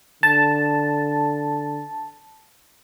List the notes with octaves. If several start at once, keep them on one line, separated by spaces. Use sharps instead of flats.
D3 A5